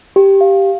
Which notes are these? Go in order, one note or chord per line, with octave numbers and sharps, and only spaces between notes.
G4
F5